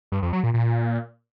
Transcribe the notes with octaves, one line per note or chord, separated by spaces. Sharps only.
G2
F2
F#3
A#2
A#2